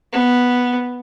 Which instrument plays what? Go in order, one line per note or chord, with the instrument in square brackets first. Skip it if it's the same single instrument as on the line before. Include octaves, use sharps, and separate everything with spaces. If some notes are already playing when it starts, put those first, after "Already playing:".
[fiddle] B3